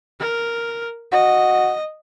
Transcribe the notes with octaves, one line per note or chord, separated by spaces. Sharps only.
A#4
F#4 D#5